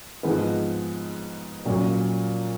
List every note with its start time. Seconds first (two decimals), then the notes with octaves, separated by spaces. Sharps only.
0.23 G#2 F3 G#3 B3
1.65 A#2 F#3 C#4